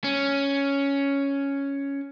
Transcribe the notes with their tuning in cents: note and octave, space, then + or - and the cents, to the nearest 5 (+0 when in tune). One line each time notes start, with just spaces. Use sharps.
C#4 +5